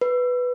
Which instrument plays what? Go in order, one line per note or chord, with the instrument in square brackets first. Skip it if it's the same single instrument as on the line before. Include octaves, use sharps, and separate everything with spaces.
[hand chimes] B4